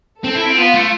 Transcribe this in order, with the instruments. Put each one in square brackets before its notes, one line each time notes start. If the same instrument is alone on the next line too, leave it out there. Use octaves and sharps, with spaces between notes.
[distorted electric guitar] C4 [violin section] A4
[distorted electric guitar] E4
C4
[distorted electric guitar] B3 [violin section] F4
[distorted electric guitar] A3